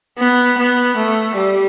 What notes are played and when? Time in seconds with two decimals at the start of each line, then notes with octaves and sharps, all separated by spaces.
0.18 B3
0.58 B3
0.97 A3
1.37 G3